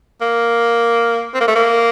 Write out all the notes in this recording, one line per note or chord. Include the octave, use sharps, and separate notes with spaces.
A#3
C4
A#3
A3
A#3